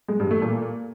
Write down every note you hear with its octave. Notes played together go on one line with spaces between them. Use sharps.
G#3
G2
A3
A#2